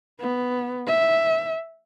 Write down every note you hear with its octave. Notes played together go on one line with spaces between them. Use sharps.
B3
E5